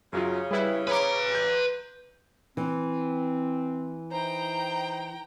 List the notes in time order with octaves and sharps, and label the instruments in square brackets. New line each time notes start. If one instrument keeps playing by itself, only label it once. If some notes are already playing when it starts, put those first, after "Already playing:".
[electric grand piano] F#2 F#3 F4 [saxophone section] C#3
[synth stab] G3 E4 [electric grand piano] G#4 B4
[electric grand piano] G#4 C#5 [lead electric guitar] B4 A#5 [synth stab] B5 D6
[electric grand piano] G6
[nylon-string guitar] E3 [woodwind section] C4
[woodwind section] D#4 E4 C5 [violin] G5 A#5